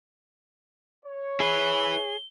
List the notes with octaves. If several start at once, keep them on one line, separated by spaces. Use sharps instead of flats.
C#5
E4 G#4 B4 G7